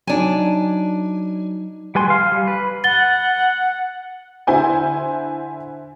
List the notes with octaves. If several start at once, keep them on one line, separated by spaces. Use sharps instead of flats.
F#3 D4 D#4 G#5
G3 B4 G#5 C6
F5
G3
B4
F#5 A6 G7
D3 E4 C5 G#5 G6